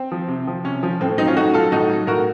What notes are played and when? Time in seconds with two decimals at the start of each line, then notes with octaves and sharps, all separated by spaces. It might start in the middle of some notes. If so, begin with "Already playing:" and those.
Already playing: C4
0.12 F3
0.28 C3
0.47 F3
0.64 C3 C#4
0.83 F3
1.01 A2 C4
1.18 F#3 C4 D#4
1.27 C#4 F4
1.37 A2 D#4 F#4
1.54 F#3 F4 A4
1.72 A2 D#4 F#4
1.89 F#3
2.07 A2 F#4 A#4